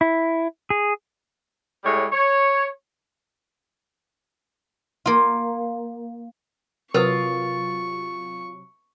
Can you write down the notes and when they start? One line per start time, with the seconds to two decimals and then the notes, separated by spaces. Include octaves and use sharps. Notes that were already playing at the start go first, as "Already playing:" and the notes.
0.01 E4
0.70 G#4
1.84 A2 G3 G#3 C#5
2.11 C#5
5.06 A#3 F4
6.94 C3 F#3 F4 A#4 B4 C#6 D#6